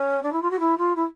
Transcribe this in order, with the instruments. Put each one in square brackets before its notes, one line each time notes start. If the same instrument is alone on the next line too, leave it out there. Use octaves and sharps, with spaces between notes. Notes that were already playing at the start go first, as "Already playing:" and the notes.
Already playing: [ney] C#4
D4
E4
F4
F#4
E4
F4
E4